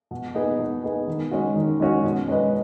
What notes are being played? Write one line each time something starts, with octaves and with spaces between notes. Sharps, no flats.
B2
B3 D#4 G#4
B2
B3 D#4 G#4
D#3
G#3 C#4 F#4
D#3
G#3 C#4 F#4
B2
G#3 C#4 B4 D#5